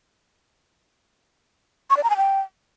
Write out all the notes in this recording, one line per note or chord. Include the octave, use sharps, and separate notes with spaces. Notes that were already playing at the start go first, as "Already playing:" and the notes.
C#6
D5
A#5
G#5
G5